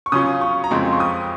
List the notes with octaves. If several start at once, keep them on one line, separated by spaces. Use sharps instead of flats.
C#6
C#3 F#3 C#4 F4 D#6
C#6
A#5
F2 C#3 G#3 C4 F4 C6
C#6
D#6